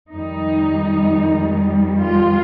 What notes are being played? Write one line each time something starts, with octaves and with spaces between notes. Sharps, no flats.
F2 D#3 G3 D#4
F4